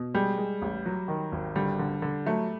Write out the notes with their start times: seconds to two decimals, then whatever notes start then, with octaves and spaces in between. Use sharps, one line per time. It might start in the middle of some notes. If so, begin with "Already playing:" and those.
Already playing: B2
0.14 G3 G#3
0.38 G#3
0.62 A1
0.85 F#3
1.08 D#3
1.32 G#1
1.56 D3 G3
1.79 D3
2.02 D3
2.26 F#3 A3